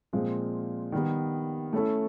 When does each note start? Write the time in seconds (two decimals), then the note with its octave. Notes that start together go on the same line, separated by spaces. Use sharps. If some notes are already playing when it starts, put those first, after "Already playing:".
0.13 A#2 F3 G#3 C4
0.92 D#3 G3 B3
1.73 A3 C#4 E4 A4